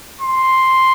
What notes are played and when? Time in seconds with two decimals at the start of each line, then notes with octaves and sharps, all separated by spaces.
0.21 C6